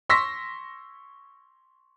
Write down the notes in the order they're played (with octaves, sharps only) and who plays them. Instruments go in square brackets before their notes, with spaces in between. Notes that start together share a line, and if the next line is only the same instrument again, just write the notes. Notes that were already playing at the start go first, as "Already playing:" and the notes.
[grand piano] C6 C#6 E6 A#6 B6